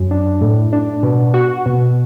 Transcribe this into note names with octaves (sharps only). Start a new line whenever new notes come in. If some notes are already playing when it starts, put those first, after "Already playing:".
Already playing: F#2
D4
A2
D4
B2
F#4
B2